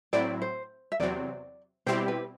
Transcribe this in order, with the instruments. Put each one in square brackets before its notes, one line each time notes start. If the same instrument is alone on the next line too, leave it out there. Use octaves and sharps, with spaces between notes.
[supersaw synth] A2 F#3 C4 E4 [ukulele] D5
[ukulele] C5
E5
[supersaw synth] E2 C3 F#3 C4 [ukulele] D5
[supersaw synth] B2 G3 C4 E4 G4 [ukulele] C5
[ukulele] B4